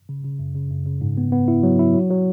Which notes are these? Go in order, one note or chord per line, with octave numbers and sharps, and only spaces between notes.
C#3
C#3
F#2
C#3
F#2
C#3
G#2
B3
B3
E4
F#3
E4
F#3
F#3